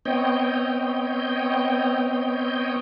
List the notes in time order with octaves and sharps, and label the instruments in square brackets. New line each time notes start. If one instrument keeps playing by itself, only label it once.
[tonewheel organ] B3 C4 C#5 D#5 G5